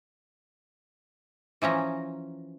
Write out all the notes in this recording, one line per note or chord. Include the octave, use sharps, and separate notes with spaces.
E3 F3 C#4 A#5